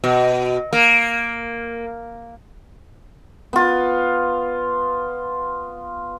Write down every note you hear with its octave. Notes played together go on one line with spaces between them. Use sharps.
B2
A#3
B3 F4